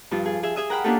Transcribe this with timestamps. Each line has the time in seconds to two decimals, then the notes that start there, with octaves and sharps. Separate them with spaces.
0.11 G2 F3 F4
0.26 G#4
0.43 G#4 E5
0.56 G#4 E5 D#6 E6
0.70 A#4 F#5 G5 B5 F6
0.84 A#3 C#4 D4 F4 G4 A4